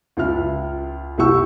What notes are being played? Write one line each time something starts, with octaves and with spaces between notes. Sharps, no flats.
C#2 F4 E5 F6
C2 E4 G4 F#5 C#6 E6